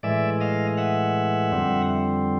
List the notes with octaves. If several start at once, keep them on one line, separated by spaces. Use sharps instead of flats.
A2 E3 G#3 D5 E5
D#5 F5
E5 F#5
F2 D3 G3 C4